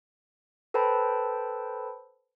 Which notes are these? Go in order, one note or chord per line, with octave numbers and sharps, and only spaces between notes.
A4 B4 C5 G5 A5 B5